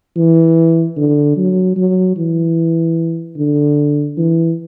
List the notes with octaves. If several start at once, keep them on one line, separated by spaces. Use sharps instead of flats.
E3
D3
F#3
F#3
E3
D3
E3